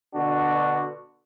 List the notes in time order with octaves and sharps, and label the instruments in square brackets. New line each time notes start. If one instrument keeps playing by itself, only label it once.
[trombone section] B2 D3 D4 F#4